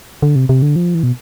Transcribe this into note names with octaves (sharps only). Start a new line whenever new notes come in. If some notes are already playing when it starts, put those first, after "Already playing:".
D3
C3
C3
D3
F3
E3
B2